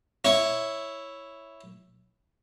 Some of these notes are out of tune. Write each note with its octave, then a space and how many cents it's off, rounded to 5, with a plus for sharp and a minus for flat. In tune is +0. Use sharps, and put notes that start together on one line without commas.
E4 +0 C#5 +0